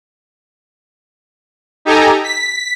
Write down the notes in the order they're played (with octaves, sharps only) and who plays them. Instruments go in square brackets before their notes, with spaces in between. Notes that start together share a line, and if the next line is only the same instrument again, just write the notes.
[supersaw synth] D#4 G4 A4 G#5 A#5
B6